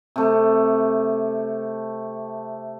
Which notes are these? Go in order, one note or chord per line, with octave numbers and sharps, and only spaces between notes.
C3 A3